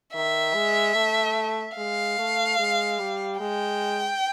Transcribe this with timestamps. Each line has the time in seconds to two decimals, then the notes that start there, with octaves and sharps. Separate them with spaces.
0.14 D#3 E5
0.54 G#3
0.95 A3
1.77 G#3 F5
2.18 A3
2.59 G#3
2.99 G3
3.40 G#3 G5